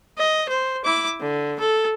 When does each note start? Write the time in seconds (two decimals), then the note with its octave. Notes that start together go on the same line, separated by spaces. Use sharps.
0.18 D#5
0.49 C5
0.85 E4 D6
1.21 D3
1.60 A4